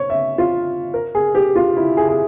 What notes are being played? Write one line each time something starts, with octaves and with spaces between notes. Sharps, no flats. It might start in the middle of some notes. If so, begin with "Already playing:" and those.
Already playing: C#5
E5
F4
A#4
G#4
G4
F4
E4
G#4
G#4